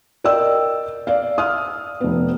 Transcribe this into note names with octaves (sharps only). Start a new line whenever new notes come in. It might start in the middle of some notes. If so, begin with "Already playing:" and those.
A#4 D5 D#5 G5 E6
D5 F5
D#6 F6
F1 B3